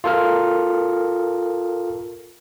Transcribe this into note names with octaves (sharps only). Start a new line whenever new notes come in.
F4 A4 A#4 F6